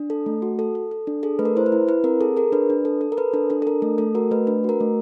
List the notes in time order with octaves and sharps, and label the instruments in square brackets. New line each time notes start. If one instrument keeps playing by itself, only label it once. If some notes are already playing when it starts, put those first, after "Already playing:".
Already playing: [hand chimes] D4
A4
A3
F#4
A4
A4
A4
D4
G#4 A4
A3 B4
A#4
E4 C5
B4
E4
E4 B4
C4 A#4
G#4 A4
G#4 A#4
D4 B4
D4
A4
A4
A#4
A4 B4
D4 A4
D4 A4
A4
D4 A#4
A3 A4
A3 A4
F#4 A#4
A3 B4
D4 B4
F#4 A#4
A3